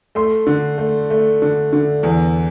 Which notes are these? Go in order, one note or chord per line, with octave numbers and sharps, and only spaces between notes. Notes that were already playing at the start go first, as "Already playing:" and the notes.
A3 C6
D3
A3
A3
D3
D3
E2